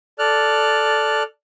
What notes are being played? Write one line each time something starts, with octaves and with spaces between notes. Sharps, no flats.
A4 D5 F6 F#6